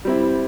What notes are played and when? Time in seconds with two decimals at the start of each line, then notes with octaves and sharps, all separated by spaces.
0.05 G3 C4 E4